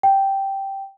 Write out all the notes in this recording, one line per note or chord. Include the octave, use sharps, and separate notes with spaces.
G5